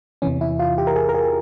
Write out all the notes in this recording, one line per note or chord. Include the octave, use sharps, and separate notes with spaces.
E2 C3 E3 C#4
E4
F4
G4
A#4
G#4
A#4
G#4